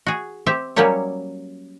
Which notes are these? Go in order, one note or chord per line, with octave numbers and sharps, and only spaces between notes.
F#4 G#4
C4 G4 E5
F#3 G3 A#3 C#4 G4 C#5